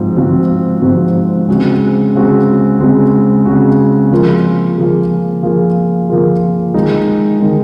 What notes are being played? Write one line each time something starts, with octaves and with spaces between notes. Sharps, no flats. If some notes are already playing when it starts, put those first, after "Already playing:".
Already playing: G#2 F3 C4 F#4
G#2 F3 C4 F#4
G#2 F3 C4 F#4
C#3 G#3 C4 F#4
C#3 G#3 C4 F#4
C#3 G#3 C4 F#4
C#3 G#3 C4 F#4
F3 A#3 F4 G#4
F3 A#3 F4 G#4
F3 A#3 F4 G#4
F3 A#3 F4 G#4
D#3 G#3 D#4
D#3 G#3 D#4